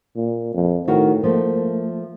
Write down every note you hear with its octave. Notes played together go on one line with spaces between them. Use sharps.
A#2
F2
A2 D#3 F#4 A#4
F3 A3 A#3